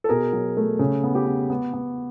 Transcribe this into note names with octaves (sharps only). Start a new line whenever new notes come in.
A4
B2 G#4 A#4
F#3
A3
C#3
B3
G4
B3
B3
B3